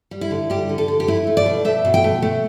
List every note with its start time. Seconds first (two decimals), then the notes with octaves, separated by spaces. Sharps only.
0.11 G3
0.21 E4
0.31 D3
0.50 G3 G4
0.69 D3
0.78 A4
0.88 D3
1.00 G4
1.07 A3 E4
1.27 A3
1.37 D5
1.46 B2
1.65 A3 E5
1.85 B2
1.94 G5
2.04 A3
2.22 A3